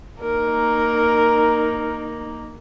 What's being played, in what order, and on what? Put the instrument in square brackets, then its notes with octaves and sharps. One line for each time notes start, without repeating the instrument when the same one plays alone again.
[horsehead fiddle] A#3 D#4 [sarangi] A#4